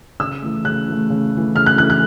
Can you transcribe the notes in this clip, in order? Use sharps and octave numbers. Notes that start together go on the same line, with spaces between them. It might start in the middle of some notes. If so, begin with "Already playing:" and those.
C#3 E6
E3 A3
C#3 F#6
E3 A3
C#3
E3 A3
C#3 F6
F#6
E3 A3 F#6
F#6